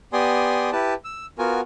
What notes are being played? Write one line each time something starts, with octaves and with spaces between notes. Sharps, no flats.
B3 G4 D5 G#5 C6 D#6
E4 G4 B4 A5
E6
B3 F4 F#4 A#4 G#5